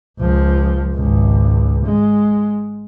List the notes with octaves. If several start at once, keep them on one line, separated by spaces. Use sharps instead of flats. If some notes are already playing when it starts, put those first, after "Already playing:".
C#2 F3
G#1 C#2
G#3